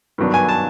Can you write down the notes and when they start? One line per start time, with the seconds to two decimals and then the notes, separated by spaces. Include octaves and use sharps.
0.18 G2 D#3 F#3 B3 D4
0.34 G#5
0.49 A5